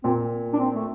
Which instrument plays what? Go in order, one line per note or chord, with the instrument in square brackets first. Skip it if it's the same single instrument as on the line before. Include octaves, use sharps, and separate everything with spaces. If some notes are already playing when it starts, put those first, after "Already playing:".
[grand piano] A#2 [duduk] C4
[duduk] D4
C4
A3